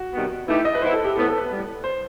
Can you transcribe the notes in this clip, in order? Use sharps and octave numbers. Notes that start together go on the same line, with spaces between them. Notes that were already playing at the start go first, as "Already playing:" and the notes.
Already playing: F#4
C3 D#3 G3 B3
E3 A3 D#4 E4 G4
D#5
B4
E3 B3 E4 C5
A4
G4
A2 E3 B3 A4
A4
B4
A2 G3 B3
C5